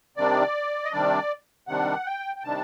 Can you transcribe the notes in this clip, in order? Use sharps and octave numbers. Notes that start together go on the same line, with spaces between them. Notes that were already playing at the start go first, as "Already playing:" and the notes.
C3 D#3 G3 D4 D5
D#5
C3 D#3 G3 D4 D5
C3 D#3 G3 D4 F#5
G5
G5
C3 D#3 G3 D4 A5